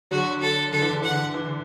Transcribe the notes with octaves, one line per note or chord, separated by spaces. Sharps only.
D3 F#3 F#4
A4
D3 A4
E3
D3
E3 F#5
D3
E3
D3